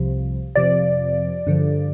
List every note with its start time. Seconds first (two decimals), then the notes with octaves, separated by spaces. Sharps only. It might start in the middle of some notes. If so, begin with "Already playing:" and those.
Already playing: C2 C3 F3
0.56 F2 C3 F3 D5
1.47 G2 D3 F3